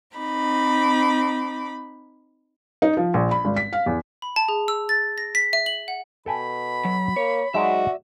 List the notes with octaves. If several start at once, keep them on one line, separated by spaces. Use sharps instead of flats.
C4 D#4 B5 D6
D#4
F3
A#1
B5
G#1
B6
F5
E2
B5
A5
G#4
E6
A6
A#6
B6
E5
F#7
F#5
B2 A4 G5 G#5 B5
F#3
A#3 C#5
F#3 G#3 D#4 F#4 D5 E5